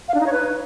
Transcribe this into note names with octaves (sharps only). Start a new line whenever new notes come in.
F5
D4
D#4
C#5
B4